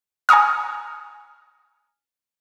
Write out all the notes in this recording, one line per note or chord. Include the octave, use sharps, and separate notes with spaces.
G#5 A#5 C#6 D#6 F6